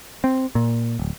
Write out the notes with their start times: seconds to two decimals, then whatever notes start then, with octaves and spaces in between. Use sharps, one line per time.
0.24 C4
0.55 A#2
0.99 D1